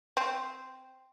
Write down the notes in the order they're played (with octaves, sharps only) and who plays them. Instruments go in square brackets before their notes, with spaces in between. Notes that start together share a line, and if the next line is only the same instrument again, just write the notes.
[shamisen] C4